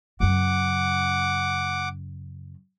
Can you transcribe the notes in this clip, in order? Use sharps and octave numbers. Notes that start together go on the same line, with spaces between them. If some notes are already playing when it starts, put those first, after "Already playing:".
F#2 C#3 F#5 D6